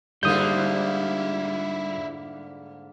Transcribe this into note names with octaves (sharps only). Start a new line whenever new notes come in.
G#2 D3 G3 A#3 E4 F4 D#6 G6